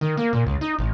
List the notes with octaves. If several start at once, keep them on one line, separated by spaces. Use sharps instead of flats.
D#3
A#3
A#2
C#2
D#4
A1